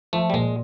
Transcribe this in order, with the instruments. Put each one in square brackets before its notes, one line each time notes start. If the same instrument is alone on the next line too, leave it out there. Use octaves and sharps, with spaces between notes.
[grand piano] F3 [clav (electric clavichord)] A3
[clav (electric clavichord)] G3
[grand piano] A#2 [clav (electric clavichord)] G#3